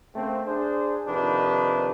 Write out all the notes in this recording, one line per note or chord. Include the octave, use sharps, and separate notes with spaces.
C#3 A3 A#3 C4
D4 G#4 C5
F2 C3 D#3 D4 D#4 B4